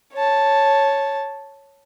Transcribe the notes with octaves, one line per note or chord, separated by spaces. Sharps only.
C#5 A5